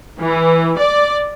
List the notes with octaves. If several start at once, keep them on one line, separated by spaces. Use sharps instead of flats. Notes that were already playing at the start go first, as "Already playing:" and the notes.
E3
D5